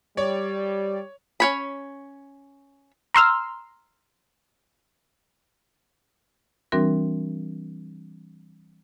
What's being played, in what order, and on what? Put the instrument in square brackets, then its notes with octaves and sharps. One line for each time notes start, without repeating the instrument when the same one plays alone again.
[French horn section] G3 [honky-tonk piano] C#5 [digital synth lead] D5
[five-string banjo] C#4 C#5 B5
[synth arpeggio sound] A#5 C6 E6 F6
[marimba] E3 G3 C4 D4 F#4 A#4